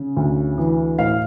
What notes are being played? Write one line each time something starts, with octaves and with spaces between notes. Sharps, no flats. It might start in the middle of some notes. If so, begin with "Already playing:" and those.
Already playing: C#3
D2
E3
A2 F5